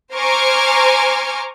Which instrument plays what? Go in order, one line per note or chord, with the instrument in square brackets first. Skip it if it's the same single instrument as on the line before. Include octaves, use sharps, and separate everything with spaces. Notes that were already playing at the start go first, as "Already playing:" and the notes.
[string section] C5 G#5 A#5 C#6 D6 F6